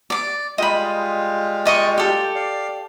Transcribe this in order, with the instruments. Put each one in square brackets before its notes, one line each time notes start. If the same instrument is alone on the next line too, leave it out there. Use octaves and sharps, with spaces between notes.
[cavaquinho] D5 D6
[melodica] G3 G#3 F4 [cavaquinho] D#5 B5
[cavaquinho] D5 D#5 C#6
G4 A4
[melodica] D5 F5